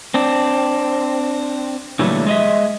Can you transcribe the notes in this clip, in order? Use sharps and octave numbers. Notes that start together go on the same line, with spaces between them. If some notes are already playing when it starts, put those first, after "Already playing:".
C4 D4
A#2 D3 E3 F#3 G3 A3
G#3 D#5 E5